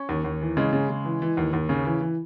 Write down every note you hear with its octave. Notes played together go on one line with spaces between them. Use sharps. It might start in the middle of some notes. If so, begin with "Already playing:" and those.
Already playing: C#4
D#2
D#2
E3
C#3 G#3
C#3
C#3
E3
E3
D#2
D#2
C#3
E3
E3